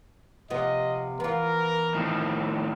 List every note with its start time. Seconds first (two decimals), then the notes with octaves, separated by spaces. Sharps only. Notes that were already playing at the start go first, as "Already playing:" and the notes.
0.50 C3 F3 B3 D#5
1.20 E3 B3 F4 A#4
1.94 A2 D#3 F3